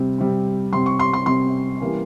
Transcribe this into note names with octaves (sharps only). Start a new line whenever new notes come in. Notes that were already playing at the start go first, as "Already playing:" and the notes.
Already playing: C3 G3 C4
C3 G3 C4
C3 G3 C4 C6
C#6
C6
C6
C3 G3 C4 C6
E3 G3 A#3 C#4